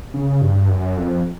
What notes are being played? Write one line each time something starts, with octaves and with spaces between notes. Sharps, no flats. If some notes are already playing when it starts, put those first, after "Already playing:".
C#3
G2
F#2
F2